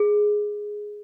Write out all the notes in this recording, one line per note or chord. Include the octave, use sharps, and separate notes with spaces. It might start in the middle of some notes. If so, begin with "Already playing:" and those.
Already playing: G#4